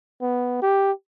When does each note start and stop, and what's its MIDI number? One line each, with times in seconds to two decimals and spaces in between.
0.22 0.60 59
0.62 0.92 67